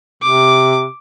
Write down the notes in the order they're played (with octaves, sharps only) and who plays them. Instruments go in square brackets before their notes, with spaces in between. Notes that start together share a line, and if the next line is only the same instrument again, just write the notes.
[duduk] C3 [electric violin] D6